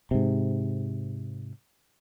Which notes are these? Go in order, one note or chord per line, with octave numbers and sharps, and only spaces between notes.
G#2 C3